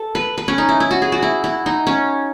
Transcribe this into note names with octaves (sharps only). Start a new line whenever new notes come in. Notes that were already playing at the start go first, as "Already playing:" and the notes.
Already playing: A4
B4
B4
C#4
D#4
E4
E4
F#4
G#4
F#4
E4
E4
D#4
C#4